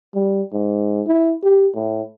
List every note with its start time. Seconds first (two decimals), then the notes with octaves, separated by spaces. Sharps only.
0.15 G3
0.52 G#2
1.06 E4
1.43 G4
1.75 A2